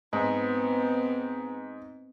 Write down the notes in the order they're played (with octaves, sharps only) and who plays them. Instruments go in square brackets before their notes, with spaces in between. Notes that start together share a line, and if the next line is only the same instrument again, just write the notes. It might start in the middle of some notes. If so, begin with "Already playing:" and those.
[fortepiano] G#2 [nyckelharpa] B3 C4